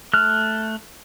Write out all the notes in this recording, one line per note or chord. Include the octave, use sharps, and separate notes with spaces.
A3 F6 F#6